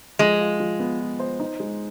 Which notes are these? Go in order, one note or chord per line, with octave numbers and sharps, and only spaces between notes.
F3 G#3
F4
F3
B3
F4
C5
D#4
G#3